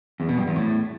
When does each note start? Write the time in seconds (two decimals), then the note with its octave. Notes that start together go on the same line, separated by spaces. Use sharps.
0.20 E2
0.29 B2
0.38 G2
0.47 E2
0.56 A2